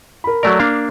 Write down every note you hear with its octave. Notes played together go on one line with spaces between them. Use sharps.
A#4 B5
F#3 A3 A#4 D5
A#3 D4 F5